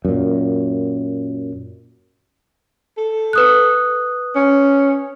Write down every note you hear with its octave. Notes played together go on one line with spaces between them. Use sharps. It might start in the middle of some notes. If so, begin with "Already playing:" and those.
F#2 A#2
A4
B4 D#6 F#6
C#4